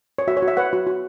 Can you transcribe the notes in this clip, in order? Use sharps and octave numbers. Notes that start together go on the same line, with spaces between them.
C#5
F#4 E5
C#5
F#4
E5
B4 C#5 F#5
F#4
F#4